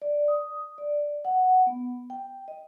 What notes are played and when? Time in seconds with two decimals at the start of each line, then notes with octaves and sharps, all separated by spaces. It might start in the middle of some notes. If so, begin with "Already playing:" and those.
0.02 D5
0.28 D#6
0.78 D5
1.25 F#5
1.67 B3
2.10 G5
2.48 D#5